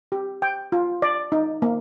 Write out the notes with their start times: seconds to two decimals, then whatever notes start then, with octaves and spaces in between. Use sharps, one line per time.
0.12 G4
0.42 G5
0.72 F4
1.02 D5
1.32 D#4
1.62 A#3